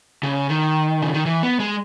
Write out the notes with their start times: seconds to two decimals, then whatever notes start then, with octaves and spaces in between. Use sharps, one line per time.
0.23 C#3
0.49 D#3
1.02 C#3
1.14 D#3
1.26 E3
1.43 B3
1.60 G#3